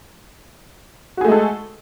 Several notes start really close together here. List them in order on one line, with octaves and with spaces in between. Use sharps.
F#4 G#4 A3 G#3 A4